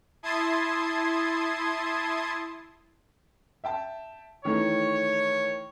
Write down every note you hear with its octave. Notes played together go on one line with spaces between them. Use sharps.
E4 A5 C6 D#6 G#6
E5 G5 A5
D#3 E3 A3 C#5